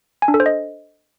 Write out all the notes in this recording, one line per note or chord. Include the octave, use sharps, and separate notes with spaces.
G#5
D4
A4
C5
D#5